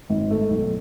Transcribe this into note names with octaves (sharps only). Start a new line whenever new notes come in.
G#1
A3
B1